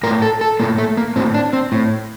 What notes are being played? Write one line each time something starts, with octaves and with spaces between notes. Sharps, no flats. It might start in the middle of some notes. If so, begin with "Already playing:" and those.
A2 A#4
A4
A4
A2 A#3
A3
A#3
A2 C4
D4
C4
A2